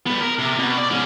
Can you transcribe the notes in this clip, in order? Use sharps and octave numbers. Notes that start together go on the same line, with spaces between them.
G3 B3
A#4
C3
B2
D5
G#2 C#4